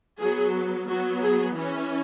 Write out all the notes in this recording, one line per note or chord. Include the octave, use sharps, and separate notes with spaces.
F#3 B3 G#4
F#3 B3 F#4
G#4
E3 C#4